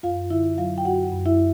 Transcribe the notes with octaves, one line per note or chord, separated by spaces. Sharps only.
F#2 F4 F5
D3 E4 E5
F#3 F4 F5
G5
F#2 F#4 F#5
F#2
E4 E5